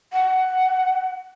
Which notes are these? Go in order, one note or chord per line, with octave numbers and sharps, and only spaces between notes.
F#5